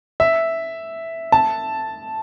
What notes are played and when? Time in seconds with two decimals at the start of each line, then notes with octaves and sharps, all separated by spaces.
0.20 E5
1.32 A5